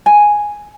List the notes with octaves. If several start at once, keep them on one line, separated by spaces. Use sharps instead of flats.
G#5